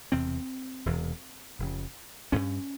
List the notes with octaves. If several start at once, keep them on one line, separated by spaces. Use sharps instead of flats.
E1 E2 C3 C4
E1 E2 C3
F1 F2 C#3
G1 G2 C#4